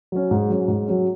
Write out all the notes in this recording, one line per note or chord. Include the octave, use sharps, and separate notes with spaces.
F#3 C#4
G#2
F#3 C#4
G#2
F#3 C#4